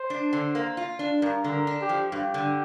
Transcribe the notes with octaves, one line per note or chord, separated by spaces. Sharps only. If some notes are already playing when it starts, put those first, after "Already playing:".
Already playing: C5
D4
D3
A#3
F4
D4
G2 A#4
D3
A#4
D4
G4
F3
G2 G4
D3